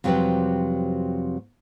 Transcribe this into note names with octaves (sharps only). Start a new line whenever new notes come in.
F2 C3 F#3 G3 G4 B4